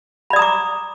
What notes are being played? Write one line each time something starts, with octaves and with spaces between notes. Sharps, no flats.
D5 A#5 B5 D6 D#6